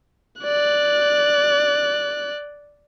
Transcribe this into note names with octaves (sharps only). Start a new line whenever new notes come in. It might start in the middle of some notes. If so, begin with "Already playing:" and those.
D5 F#6